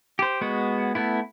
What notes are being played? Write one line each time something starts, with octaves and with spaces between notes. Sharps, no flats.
G4 C5
G#3 B3 F#4
A3 B3 E4